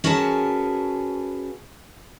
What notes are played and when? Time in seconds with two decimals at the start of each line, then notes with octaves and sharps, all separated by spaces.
0.04 C#4 F#4 G#4 A#4 B4 A5